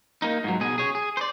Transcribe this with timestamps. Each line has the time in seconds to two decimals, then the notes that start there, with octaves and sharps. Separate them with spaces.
0.22 A#3 D#4
0.44 G#2 F#3
0.61 B2 G#4
0.78 G#4 C#5
0.95 G#4
1.17 C5 D5